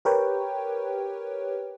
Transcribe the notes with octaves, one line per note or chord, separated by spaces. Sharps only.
G4 A#4 B4 C#5 G5